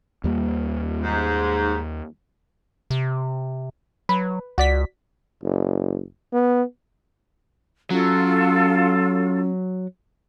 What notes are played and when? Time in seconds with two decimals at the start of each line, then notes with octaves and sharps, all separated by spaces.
0.24 D#2 G3 A#3
1.02 G#2
2.90 C3
4.09 F#3 B4
4.58 C#2 F#4 D5 B6
5.44 F#1
6.33 B3
7.90 F#3 C#4 F4 A4